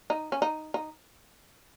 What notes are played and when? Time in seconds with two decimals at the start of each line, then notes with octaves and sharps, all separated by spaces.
0.10 D#4
0.32 C#4
0.42 D#4
0.74 D#4